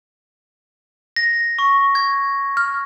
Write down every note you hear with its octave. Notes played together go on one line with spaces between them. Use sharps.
A#6
C#6
G#6
F6